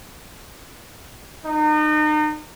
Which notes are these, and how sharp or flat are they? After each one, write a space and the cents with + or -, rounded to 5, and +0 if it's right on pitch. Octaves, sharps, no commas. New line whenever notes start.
D#4 -35